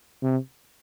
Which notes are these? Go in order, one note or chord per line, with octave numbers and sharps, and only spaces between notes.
C3